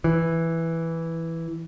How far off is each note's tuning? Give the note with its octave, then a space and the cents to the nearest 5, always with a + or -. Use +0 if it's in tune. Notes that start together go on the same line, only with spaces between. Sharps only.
E3 +0